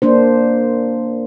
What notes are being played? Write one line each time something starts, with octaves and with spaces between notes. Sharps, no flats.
A#3 D4 C5